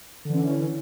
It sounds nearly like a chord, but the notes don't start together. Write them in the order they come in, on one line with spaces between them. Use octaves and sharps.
D3 E3 C#4